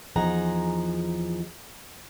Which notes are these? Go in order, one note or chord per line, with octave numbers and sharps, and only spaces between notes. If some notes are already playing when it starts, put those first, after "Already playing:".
E2 F3 D#4 G#4 F#5 A#5